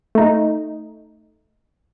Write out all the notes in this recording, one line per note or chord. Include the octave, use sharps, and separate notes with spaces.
A3 D#4